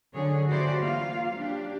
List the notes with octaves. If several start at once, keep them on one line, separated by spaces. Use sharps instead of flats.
D3 F#3 G#4 C#5
E3 A#3 F#4 G4 C5 D5
A#3 F4 F5
F#3 D4 G4